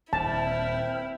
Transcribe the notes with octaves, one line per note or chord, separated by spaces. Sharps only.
D#1 C4 E4 G5 A5 F6